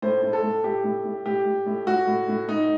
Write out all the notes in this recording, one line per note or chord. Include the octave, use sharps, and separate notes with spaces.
A2 C5
A2
A4
A2
A2 G4
A2
A2
A2 G4
A2
A2
A2 F#4
A2
A2
A2 D#4